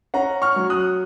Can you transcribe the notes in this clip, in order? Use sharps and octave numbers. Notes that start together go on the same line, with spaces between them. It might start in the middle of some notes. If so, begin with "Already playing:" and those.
C#4 F#5 A#5
C#6 F6
F#3
D#6 F#6